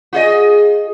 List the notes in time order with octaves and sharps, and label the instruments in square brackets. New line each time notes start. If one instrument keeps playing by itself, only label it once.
[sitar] F4 G#4 D#5